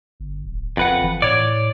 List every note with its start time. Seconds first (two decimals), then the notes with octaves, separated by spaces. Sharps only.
0.20 G1
0.44 D1
0.77 F#1 F2 B4 F#5
1.03 E3
1.22 A2 C#5 D5